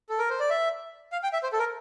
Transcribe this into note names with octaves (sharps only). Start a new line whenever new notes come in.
A4
A#4
C5
D5
E5
F5
G5
E5
C5
A4
A#4